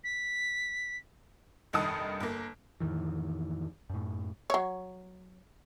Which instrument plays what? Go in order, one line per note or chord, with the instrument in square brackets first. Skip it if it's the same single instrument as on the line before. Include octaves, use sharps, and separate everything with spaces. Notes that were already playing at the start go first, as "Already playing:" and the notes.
[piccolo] B6
[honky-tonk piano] F1 A#1 G2 D#3 A5 D#6
G1 A#3
[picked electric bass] F2 A2 D#3 E3
F#2 A2
[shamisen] F#3 C#5